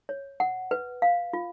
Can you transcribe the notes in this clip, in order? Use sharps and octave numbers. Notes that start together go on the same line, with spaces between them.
C#5
F#5
B4
F5
F4